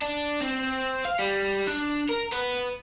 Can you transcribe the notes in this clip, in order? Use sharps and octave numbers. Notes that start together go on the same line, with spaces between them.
D4
C4
F5
G3
D4
A#4
B3